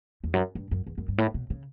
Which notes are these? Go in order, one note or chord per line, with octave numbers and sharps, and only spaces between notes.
E2
F#2
G2
F#2
E2
F#2
G2
A2
B2
C#3